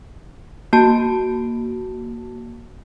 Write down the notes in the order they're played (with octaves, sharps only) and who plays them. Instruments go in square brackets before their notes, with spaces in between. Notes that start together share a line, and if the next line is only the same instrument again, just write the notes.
[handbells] A#3 F#4 A5